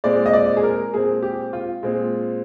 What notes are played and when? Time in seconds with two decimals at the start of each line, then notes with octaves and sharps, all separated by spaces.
0.04 A#2 G#3 C4 D5
0.26 D#5
0.33 D5
0.57 G#4
0.63 A#4
0.94 A#2 G#3 C4 G#4
1.22 G4
1.53 F4
1.83 A#2 G#3 C4